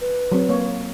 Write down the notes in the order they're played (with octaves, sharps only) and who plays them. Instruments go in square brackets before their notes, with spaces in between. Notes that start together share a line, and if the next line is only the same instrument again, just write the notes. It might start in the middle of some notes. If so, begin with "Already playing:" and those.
[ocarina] B4
[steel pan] F#3 C4
A#3 C#5